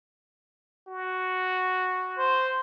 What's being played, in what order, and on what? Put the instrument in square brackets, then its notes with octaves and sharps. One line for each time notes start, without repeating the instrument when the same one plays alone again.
[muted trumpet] F#4
[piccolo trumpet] C5